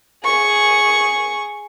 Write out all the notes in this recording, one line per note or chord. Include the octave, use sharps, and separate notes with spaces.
G#4 C#6